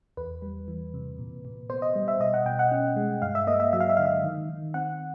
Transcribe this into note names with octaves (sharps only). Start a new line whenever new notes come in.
E2 B4
G3
E3
C3
A#2
A#2
B3 C5
D#5
G3
E5
B2 D#5
F#5
B2 G5
F#5
C#4
G#3
G2 F5
E5
A#3 D#5
E5
F#3 E5
F5
E5
D3 F5
E5
D#3
D#3
C4 F#5